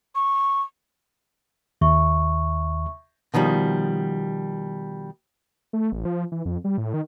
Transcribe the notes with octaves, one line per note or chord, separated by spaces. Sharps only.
C#6
D#2 E5 C#6
B2 D#3 F3 G3
A3
A1
F3
E3
F2
G3
A2
D#3